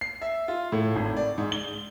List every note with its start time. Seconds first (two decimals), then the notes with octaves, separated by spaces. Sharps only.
0.01 C7
0.22 E5
0.48 F4
0.72 A2
0.96 G#1
1.17 D5
1.38 G#2
1.52 G7